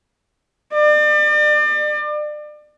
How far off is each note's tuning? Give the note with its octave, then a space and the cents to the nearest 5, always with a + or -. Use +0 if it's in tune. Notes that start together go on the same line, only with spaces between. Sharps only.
D5 +35